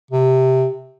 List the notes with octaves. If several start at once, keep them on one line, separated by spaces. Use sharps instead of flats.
C3